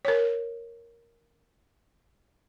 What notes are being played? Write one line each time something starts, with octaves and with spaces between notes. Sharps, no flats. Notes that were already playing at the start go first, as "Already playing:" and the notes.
A#4 C#5